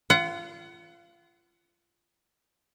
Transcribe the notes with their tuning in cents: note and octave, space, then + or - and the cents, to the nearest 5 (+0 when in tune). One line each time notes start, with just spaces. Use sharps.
F4 -25 F#5 +20